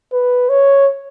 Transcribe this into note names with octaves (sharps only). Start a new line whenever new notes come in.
B4
C#5